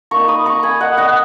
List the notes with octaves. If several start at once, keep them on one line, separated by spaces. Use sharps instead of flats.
A#3 D#4 A#5 C#6
B5 D#6
A#5 C#6
G#5 B5
D#5 F#5
D#5 F#5